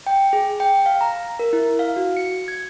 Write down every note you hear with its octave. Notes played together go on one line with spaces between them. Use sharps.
G5
G#4
G5
F5
A#5
A#4
E4
F5
F#4
C#7
G#6